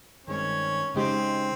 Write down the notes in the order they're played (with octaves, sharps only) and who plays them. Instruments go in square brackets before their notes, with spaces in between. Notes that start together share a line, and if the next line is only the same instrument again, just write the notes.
[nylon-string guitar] G2 D#3 G#3 C4 [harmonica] C#4
[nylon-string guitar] C#3 G#3 D#4 G4 [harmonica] C4